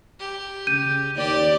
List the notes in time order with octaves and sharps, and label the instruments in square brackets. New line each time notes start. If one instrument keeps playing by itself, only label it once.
[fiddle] G4
[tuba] C#3 [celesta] G6 D#7
[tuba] D#2 [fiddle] G4 [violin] D5